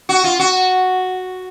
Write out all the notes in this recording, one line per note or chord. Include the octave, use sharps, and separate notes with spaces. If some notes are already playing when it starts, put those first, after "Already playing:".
F#4
F4
F#4